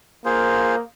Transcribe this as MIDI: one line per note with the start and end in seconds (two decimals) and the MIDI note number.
0.25 0.82 58
0.25 0.76 65
0.25 0.76 68
0.25 0.76 72